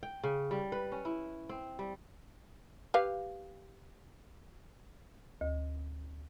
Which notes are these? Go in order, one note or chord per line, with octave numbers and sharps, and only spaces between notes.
G5
C#3
G3
B4
C#4
E4
C4
G3
G4 B4 F5
D2